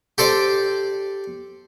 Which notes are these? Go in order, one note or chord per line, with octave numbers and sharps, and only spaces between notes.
G4 A4 C5 D5